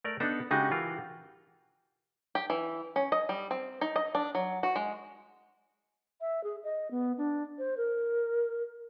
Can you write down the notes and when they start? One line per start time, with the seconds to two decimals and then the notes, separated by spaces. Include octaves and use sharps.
0.04 A3 A#4 D5
0.20 B3 D4 D#4 A4
0.51 C#3 G#3 D#4 F#4 G4
0.71 E3 F4 A#4
2.35 G4
2.50 E3
2.96 C#4
3.12 D#5
3.29 G3
3.51 C4
3.81 D#4
3.96 D#5
4.15 D4
4.35 F#3
4.63 F#4
4.76 G#3
6.20 E5
6.44 G#4
6.64 D#5
6.91 B3
7.18 D4
7.59 C5
7.77 A#4